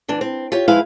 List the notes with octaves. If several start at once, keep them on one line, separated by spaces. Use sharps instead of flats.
D2 E3 D4
C4
F4 G4 C#5
F3 G#3 E4 G#4 B4 F5